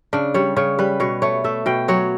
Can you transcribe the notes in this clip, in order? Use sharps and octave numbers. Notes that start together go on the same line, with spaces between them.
C#3 D4
G3 C#5
C#3 C#5
G3 B4
B2 C#5
A3 C#5
A3 E5
B2 G5
F#3 C#5